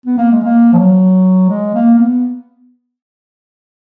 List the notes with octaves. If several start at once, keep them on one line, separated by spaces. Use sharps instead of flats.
B3
A#3
G#3
A#3
F3
F#3
G#3
A#3
B3